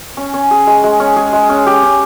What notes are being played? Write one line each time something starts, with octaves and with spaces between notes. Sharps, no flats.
C#4
C#4
G#4
G#3
G#3
C#4
G#4
G#3
C#4
G4
C#4